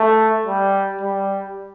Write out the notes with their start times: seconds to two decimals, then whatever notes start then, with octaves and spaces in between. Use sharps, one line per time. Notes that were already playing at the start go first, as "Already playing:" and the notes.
Already playing: A3
0.46 G3
1.01 G3